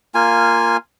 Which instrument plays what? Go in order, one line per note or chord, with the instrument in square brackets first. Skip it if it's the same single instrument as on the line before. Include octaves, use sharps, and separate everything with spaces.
[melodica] A#3 F4 G#5